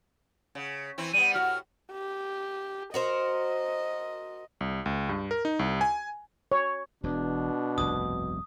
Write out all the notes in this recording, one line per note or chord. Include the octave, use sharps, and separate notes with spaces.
C#3
E3 C4 E4
G3 B3 D#7
A2 F#4 F6
G4
F#4 A#4 C5 D#5
C2
C#2
G2
A#4
D#4
C2
G#5
C#5
E1 E2 B2 D4
F1 C2 G2 D#6